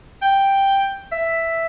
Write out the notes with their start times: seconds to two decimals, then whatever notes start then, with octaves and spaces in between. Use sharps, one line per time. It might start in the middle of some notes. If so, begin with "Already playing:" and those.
0.22 G5
1.12 E5